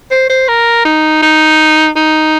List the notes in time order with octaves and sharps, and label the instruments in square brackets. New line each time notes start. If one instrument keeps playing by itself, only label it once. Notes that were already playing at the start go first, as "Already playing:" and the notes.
[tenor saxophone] C5
C5
A#4
D#4
D#4
D#4